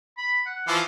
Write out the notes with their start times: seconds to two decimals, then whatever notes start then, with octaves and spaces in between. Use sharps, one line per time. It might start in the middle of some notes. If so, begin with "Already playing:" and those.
0.18 B5
0.46 F#5
0.68 E3 F3 F5